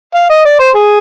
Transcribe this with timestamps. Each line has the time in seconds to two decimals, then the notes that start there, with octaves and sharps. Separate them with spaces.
0.15 F5
0.30 D#5
0.45 D5
0.59 C5
0.75 G#4